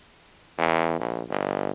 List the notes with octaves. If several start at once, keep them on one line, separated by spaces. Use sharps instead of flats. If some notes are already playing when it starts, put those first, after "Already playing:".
E2
A#1
G1